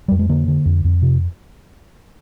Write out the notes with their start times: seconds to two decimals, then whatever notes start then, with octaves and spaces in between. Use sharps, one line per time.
0.08 F2 G3
0.19 G#3
0.29 D3 A#3
0.48 D3
0.66 F2
0.84 F2
1.02 C3